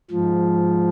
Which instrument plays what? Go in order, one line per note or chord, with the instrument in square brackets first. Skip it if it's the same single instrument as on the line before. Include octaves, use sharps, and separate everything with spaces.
[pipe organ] G#2 F3